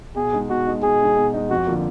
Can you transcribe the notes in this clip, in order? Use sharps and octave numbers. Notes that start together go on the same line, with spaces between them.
B2 G#4
G#3 D#4
B2 F#4
G#3 D#4
B2 G#4
G#3 D#4
B2
G#3 D#4
F2 F#4
D3 F3 A#3